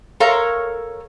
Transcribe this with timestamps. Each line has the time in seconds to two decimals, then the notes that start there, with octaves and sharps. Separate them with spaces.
0.20 A4 A#4 C#5 F5 A#5